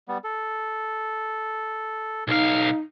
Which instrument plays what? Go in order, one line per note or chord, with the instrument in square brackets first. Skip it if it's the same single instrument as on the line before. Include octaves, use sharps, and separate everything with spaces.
[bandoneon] G3 B3
A4
[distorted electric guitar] B1 F5 [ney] D#4